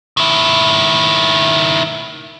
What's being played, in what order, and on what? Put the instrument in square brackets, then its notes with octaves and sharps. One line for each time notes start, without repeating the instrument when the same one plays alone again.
[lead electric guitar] D#3 E4